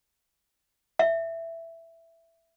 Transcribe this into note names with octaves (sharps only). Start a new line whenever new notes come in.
E5